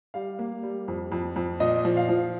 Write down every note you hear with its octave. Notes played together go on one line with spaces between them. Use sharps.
G3 F5
A#3
G3
F2
F2
F2
A#2 D#5
F3
F5
F3